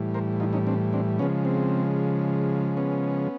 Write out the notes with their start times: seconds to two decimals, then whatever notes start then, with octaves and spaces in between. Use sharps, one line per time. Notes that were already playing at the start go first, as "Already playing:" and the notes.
Already playing: A2 E3 G3
0.14 A#4 C5
0.40 D#4 F4
0.53 C#4 D#4
0.67 C4 D4
0.93 C4 D4
1.19 C#3 F3 G#3 B3 C#4
1.45 C4
2.76 B3 C#4